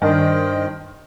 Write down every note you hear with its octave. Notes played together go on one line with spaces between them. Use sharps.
G2 D#3 D4 C5 D#5 G5